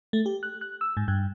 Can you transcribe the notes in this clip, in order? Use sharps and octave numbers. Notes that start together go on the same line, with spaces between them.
A3
G4
F#6
F#6
E6
G#2
G2